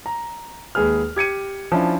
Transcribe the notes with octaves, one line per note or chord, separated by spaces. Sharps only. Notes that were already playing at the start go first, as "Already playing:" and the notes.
A#5
D#2 G#3 G#4 B4 F6
G4 G#6 C#7 D#7
F3 C#4 D4 E4